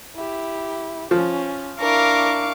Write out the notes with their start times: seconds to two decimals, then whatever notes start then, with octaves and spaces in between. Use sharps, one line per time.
0.15 E4 G4
1.11 F3 C#4
1.80 D4 E4 A#4 F5 C#6 D6